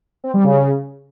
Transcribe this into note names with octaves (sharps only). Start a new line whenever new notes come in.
C4
G3
C#3